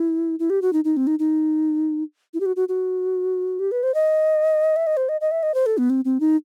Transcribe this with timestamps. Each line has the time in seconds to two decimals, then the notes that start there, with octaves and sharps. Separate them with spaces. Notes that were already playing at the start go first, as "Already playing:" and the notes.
Already playing: E4
0.39 E4
0.50 G4
0.62 F#4
0.73 D#4
0.84 D#4
0.97 C4
1.07 D#4
1.19 D#4
2.34 E4
2.40 G4
2.46 F#4
2.56 F#4
2.69 F#4
3.59 G4
3.72 B4
3.83 C5
3.94 D#5
4.76 E5
4.87 D#5
4.97 C5
5.09 D#5
5.21 D#5
5.31 E5
5.43 D#5
5.54 C5
5.66 A4
5.78 B3
5.90 C4
6.05 C4
6.20 D#4